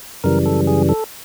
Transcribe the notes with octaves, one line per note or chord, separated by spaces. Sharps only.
F#2 C#3 E3 G3 A#4
A4
G#4
A4